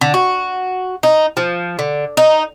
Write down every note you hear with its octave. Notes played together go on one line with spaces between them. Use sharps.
D3
F#4
D#4
F3
D3
D#4